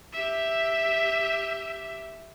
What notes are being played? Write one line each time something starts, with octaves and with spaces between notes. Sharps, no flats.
G4 E5